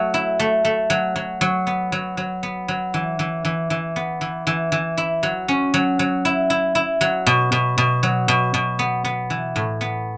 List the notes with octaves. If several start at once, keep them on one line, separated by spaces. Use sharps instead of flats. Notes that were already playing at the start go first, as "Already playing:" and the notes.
Already playing: F#3 A3
E4
A3
A3
F#3
F#3
F#3
B3
F#3
F#3
B3
F#3
E3
E3
E3
E3
B3
E3
E3
E3
E4
F#3
C#4
F#3
F#3
E4
E4
E4
F#3
B2
B2
B2
F#3
B2
B2
B3
B3
E3
A2
B3